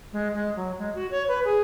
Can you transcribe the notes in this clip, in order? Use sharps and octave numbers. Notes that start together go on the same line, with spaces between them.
G#3
G#3
F#3
G#3
F#4
C#5
B4
G#4